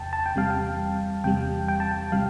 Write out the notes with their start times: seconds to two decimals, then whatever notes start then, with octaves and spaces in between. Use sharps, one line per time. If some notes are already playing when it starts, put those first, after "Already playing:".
Already playing: E2 C3 G5 A5
0.13 A5
0.26 G5
0.35 E2 C3 G3 F5
0.50 G5
1.24 E2 C3 G3 G5
1.68 G5
1.80 A5
1.91 G5
2.12 C3 G3 F5